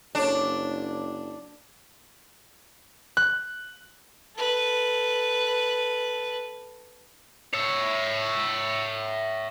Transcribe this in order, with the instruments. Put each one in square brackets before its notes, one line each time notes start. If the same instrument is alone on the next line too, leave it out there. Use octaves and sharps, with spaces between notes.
[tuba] F#1 [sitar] D4 [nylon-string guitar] A4 C#5
[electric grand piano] F#6
[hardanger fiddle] A4 B4
[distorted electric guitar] C#5 E5